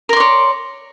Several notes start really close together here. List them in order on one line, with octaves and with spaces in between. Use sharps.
A#4 C6 D5 C#5